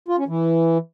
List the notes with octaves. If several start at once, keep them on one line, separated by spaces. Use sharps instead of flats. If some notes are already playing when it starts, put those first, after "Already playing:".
F4
C#4
E3